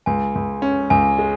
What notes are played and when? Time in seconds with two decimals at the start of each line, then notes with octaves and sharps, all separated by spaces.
0.06 C#2 G#5
0.35 C#2
0.62 C#4
0.90 C#2 G#5
1.19 G#3